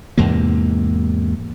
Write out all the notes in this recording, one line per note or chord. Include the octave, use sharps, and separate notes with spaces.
E2 G#2 C3 A#3